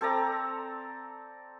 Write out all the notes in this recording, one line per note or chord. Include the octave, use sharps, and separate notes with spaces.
C4 A4 D5 A#5